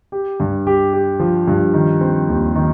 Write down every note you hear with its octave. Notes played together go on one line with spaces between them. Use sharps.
G4
G2
G4
G4
F3
G2
D#3
C4
D#2
D#3